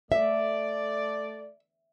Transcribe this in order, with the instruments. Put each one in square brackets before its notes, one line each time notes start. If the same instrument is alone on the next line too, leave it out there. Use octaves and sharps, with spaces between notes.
[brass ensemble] A3 D5 [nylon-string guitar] E5